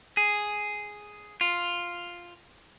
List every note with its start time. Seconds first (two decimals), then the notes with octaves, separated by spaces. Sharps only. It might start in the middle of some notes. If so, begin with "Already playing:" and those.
0.17 G#4
1.41 F4